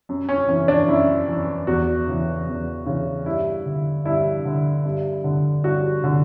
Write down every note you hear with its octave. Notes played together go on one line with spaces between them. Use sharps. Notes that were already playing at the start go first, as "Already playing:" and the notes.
F#2
C#4
E3 C#4
D4
F#2 E4
E3
E2 F#4
C#3 E3
E2
C#3 E3
G2 E4
D3
G2 E4
D3
G2
D3
G2 F#4
D3